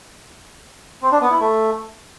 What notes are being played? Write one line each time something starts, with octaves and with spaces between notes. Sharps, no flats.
C4
D4
B3
E4
A3